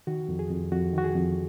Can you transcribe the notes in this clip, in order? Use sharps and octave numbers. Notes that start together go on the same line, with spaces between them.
D#3 F#4
F2
G#4
F2
F2 F#4
D#3 F#4
G#4
F2